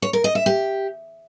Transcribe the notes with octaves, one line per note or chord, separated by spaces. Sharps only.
C#5
A#4
D#5
E5
G4